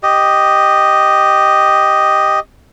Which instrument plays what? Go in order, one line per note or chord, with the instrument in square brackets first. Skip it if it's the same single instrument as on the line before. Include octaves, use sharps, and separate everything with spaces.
[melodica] G4 D#5